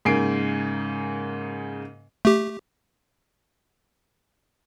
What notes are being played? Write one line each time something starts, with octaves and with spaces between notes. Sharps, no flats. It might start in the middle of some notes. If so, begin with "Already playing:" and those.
G#2 C#3 A#3 G#5 C7 D7
A3 G4